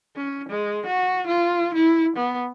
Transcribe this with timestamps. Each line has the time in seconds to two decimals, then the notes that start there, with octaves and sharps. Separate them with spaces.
0.17 C#4
0.49 G#3
0.87 F#4
1.27 F4
1.74 E4
2.17 B3